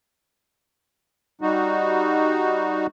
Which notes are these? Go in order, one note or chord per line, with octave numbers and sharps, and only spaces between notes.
G3 D#4 F#4